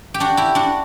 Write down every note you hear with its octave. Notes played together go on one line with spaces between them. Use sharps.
G4
D4 F#4
E4 G4
D4 F#4